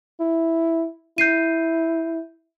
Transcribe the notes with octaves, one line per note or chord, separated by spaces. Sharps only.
E4
E4 G6 C7 D#7